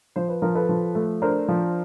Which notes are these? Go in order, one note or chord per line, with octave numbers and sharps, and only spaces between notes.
F3 C5
B4
F3 A#4
A4 B4
F3
A3
D4 A#4 C5
F3